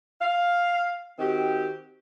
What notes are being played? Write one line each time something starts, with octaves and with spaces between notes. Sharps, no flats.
F5
D#3 C4 F#4 G4